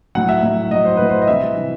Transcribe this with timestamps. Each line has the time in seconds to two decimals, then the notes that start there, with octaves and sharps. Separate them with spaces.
0.15 A2 F#3 F#5
0.29 E5
0.42 A2 F#3 E5
0.71 A2 F#3 D#5
0.85 C5
0.97 A2 F#3 B4
1.09 C5
1.22 D#5
1.27 C3 E3 G3 E5
1.56 C3 E3 G3